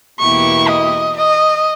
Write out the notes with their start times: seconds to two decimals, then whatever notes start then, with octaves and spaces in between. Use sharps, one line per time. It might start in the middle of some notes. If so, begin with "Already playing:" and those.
0.20 E2 B2 A#3 E4 G4 C#6
0.68 D#5
1.17 D#5